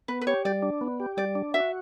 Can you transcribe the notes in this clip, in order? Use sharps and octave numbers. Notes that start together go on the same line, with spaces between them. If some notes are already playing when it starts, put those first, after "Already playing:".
B3 B4
B4
G4 C#5
G3 D5
D4
B3
G4
G3 D5
D4
F#4 E5